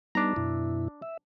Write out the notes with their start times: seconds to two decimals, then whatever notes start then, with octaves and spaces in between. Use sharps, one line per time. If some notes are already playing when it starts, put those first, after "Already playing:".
0.15 G3 B3 D4 D#4 A#5
0.36 F#2 B2 E4
1.02 E5